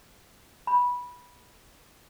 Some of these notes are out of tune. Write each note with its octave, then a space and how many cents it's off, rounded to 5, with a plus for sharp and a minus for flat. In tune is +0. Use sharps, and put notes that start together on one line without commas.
B5 -15